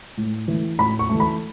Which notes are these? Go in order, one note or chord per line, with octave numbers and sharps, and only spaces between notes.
A2
E3 A3
A2 B5
C#6
E3 A3
B5